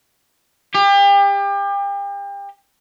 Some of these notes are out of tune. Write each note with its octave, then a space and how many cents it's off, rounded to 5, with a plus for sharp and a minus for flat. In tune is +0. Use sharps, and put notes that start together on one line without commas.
G4 +35